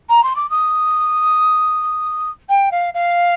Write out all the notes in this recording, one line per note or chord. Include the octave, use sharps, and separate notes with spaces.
A#5
C6
D6
D#6
G5
F5
F5